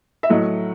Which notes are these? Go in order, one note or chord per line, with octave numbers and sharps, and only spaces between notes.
E5
A2 F#3 A3 D#5